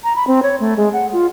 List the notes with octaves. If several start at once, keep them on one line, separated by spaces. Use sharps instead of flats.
A#5
B5
C4
C#5
A3
G#3
F#5
F4